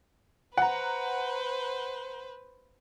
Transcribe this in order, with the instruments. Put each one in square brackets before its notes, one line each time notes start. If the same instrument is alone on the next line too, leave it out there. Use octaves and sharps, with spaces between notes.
[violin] B4 C5 [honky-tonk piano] F#5 A#5